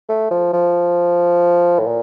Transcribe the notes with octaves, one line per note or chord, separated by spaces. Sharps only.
A3
F3
F3
A2
A#2